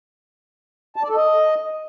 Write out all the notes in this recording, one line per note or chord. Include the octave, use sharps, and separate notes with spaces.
A5
D5
A4
D#5